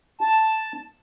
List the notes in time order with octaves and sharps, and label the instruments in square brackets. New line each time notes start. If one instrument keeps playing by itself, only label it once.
[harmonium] A5